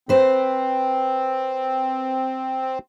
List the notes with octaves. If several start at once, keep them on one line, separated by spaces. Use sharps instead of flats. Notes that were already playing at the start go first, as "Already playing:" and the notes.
C4 B4 C5